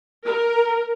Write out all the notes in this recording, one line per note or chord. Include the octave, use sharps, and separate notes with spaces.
A#4